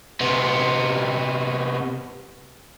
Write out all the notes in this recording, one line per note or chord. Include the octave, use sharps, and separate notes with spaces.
C3 B3